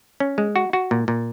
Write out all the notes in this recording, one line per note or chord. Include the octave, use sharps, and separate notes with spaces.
C#4
G#3
F#4
F#4
A#2
A#2